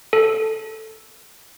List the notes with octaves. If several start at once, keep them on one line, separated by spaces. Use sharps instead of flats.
A4